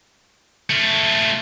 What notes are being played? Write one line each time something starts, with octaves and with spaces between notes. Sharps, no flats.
A3 F4